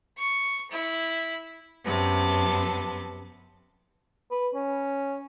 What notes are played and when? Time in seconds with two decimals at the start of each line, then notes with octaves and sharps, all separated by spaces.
0.18 C#6
0.71 E4
1.84 F#2 C3 B3 A5
4.31 B4
4.54 C#4